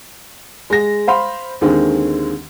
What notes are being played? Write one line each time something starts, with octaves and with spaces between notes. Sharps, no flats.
G#3 A#6
C5 F5 B5 C6
D#2 D3 D#3 G#3 C4